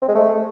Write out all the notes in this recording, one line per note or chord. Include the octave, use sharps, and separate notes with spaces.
C4
G#3
A3